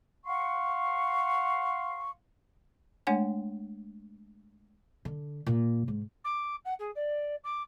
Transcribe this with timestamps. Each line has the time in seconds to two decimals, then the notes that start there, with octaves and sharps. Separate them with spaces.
0.24 F5 F#5 C6 C#6
3.07 G#3 A3 D4 C#5 F#5 G#5
5.05 D3
5.46 A#2
5.88 G#2
6.25 D6
6.65 F#5
6.79 G#4
6.96 D5
7.44 D6